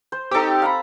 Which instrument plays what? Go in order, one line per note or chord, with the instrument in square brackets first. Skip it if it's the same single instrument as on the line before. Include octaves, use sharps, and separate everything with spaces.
[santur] C5
[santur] C4 A4 [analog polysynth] D#4 G4
[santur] F5 A#5 B5